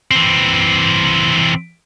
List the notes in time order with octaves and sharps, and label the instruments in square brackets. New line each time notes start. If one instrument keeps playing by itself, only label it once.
[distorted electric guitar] E3 C4